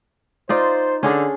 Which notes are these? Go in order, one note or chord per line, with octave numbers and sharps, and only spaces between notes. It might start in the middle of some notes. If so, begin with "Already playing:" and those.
D#4 F4 C5 D5
D3 C#4 D4 G#4